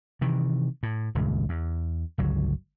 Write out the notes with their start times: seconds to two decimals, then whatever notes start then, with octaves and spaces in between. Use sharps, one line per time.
0.21 C3 D#3 E3
0.83 A2
1.15 D#1 C#2 G2
1.49 E2
2.18 G1 C#2 F#3